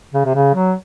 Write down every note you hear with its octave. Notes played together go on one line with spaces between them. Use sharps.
C#3
C3
C#3
F#3